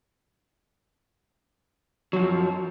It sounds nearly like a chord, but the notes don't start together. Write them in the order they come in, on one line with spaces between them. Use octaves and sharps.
F#3 F3 F#2